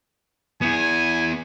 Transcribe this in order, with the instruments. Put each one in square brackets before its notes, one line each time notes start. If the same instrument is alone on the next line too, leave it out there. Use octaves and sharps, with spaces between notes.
[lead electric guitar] B3 E4 [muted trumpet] G#5